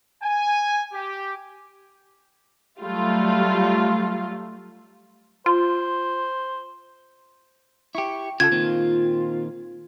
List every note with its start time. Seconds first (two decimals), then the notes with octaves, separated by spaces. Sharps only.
0.22 G#5
0.93 G4
2.82 F#3 G3 A3 F4
5.46 F4 C5
7.95 E4 G4 C#6
8.40 C#3 F4 F#4 A4 G#6
8.52 A#2 D#3 C4